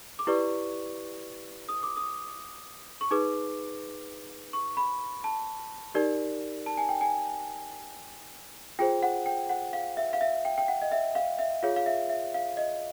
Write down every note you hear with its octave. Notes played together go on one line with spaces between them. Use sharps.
D6
E4 G4 B4 D5 C#6
D#6
D6
D#6
C#6
D#4 G#4 B4 D6
C#6
B5
A5
D#4 G4 A#4 D5
A5
G#5
G5
G#5
F4 G#4 C5 G5
F#5
G5
F#5
F5
E5
F5
E5
G5
G5
F#5
D#5
E5
F5
E5
F4 G#4 C#5 F5
F5
E5
E5
F5
D#5